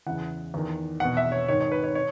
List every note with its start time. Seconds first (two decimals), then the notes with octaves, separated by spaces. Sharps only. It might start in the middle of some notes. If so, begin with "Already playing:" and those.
0.06 E2 C#3 E3 F#5
0.54 E2 D#3
1.00 E2 B2 F#5
1.17 E5
1.32 C#5
1.48 G#2 D#3 C#5
1.61 C#5
1.72 B4
1.83 C#5
1.95 C#5